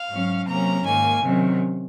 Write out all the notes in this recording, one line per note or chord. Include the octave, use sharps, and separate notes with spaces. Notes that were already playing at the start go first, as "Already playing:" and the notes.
Already playing: F5
G#2 F#3 C#4
C3 F#3 A#3 C#4 A#5
G#2 D#3 A#3 G#5
C3 D#3 F#3 C#4